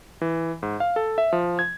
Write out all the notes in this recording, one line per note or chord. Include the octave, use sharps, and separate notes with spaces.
E3
G#2
F5
A4
E5
F3
G#6